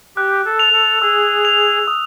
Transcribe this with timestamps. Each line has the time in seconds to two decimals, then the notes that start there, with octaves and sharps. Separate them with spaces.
0.16 G4 F#6
0.45 A4
0.59 F7
0.73 A4
1.02 G#4 E6
1.45 F7
1.88 D#6